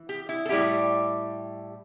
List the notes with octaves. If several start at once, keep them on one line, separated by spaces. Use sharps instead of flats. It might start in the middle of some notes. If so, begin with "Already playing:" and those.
Already playing: E3
G4
E4
A4
A2 G3 E4 G4